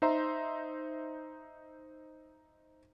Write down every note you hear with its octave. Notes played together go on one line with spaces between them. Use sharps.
D#4 C5 E5 A#5 C6